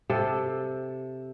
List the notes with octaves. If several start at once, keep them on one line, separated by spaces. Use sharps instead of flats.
C3 A4